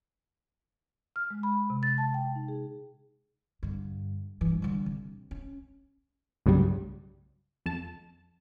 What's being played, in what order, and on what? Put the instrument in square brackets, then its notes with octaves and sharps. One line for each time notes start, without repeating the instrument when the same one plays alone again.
[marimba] F6
G#3
B5
C3
A6
A5
G5
D#4
G#4
[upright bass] G2 D3
G2 E3
D3 G3
C3
C#4
[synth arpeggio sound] C2 G2 C#3 F#3 G3
F2 A5